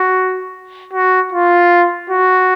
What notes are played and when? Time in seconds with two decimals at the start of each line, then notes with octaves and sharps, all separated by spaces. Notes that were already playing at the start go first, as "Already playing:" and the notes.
Already playing: F#4
0.93 F#4
1.32 F4
2.10 F#4